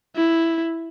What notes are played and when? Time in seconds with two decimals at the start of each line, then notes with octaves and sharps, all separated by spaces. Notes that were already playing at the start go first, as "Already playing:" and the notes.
0.16 E4